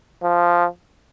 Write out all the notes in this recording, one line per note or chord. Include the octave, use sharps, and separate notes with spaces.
F3